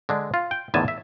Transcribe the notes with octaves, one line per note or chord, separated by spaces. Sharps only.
D3 G#3 D4
F4
G5
E2 A2 D3 D#3 G#5 A5
E5